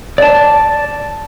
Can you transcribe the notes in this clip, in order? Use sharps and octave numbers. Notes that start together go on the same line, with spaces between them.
D5 A5